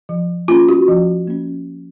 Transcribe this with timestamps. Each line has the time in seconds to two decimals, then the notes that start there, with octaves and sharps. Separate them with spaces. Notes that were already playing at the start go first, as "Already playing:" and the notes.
0.09 F3
0.48 A#3 C#4 F4
0.69 F#4
0.88 F3
1.27 A#3 C#4